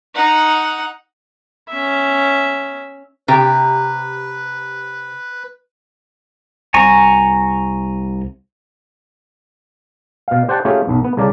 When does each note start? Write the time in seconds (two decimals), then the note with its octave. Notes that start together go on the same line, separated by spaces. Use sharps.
0.15 D#4 F#5
1.69 C#4 E5
3.28 C3 G4 B4
6.74 C2 G#5 A#5 C#6
10.28 B2 F5
10.48 G4 C5 D5 F#5 G5 A5
10.65 A3 C#4 F4 G4 G#4
10.87 B1 F#2
11.04 B3
11.17 C2 C#3 A#4 D5 A5